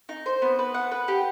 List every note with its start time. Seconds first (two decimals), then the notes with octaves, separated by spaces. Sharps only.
0.09 D#4
0.26 C5
0.42 B3
0.59 B4
0.74 F#5
0.92 B4
1.08 G4